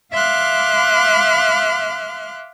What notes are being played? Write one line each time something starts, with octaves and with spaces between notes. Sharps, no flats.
E5 F5 C6 D6 F6 F#6